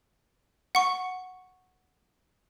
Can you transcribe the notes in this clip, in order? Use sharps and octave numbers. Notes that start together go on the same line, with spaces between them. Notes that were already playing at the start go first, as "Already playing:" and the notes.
F#5 C#6